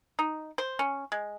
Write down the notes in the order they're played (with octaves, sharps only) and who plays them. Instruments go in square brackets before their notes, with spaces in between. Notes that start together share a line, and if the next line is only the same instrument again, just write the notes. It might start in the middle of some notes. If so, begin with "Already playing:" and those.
[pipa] D#4
C5
C#4
G#3